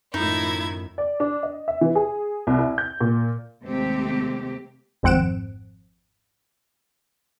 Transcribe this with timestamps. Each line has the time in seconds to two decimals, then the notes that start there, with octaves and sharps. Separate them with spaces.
0.14 F#2 A2 D#3 F3 D#4 E4 G#6
0.98 D5
1.20 D4
1.43 D#5
1.68 E5
1.81 E3
1.95 G#4
2.47 C2
2.59 E4
2.78 G6
3.01 A#2
3.64 D#2 C3 G#3 A3 C4 G4
5.03 G#1 F2 C4 F#5 D7 E7